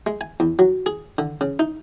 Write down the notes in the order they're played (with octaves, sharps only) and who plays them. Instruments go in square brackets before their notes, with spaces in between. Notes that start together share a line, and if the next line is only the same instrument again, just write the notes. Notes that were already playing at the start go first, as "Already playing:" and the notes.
[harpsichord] G#3
G#5
E2
F#3
G#4
D3
C#3
D#4